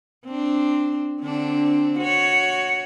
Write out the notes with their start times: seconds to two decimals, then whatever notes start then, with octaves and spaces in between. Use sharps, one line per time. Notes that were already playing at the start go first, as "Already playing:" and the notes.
0.25 C4 D4
1.22 D3 C4 D4
1.99 F#4 C#5